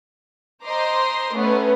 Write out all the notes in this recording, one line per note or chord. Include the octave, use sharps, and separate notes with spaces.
C5 D#5 A#5 C6 D6
A3 B3 C#4 B4